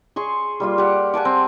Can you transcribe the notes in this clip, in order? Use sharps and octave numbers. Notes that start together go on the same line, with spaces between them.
G#4 C6 C#6
G3 A#3 F4
G4 F#5
F#5 G#5 A5 D6
C4